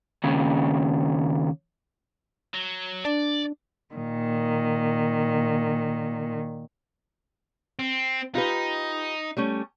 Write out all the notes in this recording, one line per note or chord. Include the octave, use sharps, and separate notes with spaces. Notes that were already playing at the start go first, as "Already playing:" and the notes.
D#2 C#3
F#3
D4 D5
A#2 D#3
C4
D#4 F4 G4 B4
G3 A3 C#4